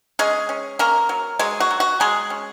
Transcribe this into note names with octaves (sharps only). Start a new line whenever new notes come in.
G#3 C#4 G#4
C#4
A#3 C#4 A#4
F#3
F#3 G#3 G#4
F#4
F#3
F#4
F#3 G#3 G#4
C#4